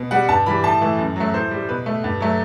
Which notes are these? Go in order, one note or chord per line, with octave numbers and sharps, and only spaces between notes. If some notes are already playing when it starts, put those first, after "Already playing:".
Already playing: B2
G3 F#5
G2 A5
E3 G3 B5
A2 A5
E3 A3
F#2
F#3 A3
A2 C5
G3
B2 B4
A3
G2
F#3 A3